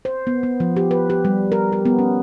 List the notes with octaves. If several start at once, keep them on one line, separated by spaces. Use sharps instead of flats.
C5
B3
B3
F3
G4
B4
G4
G3
A#4
G4
B3
C#4